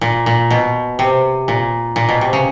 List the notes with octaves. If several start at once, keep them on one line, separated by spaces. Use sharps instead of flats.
A#2
A#2
B2
C3
A#2
A#2
B2
C3
C#3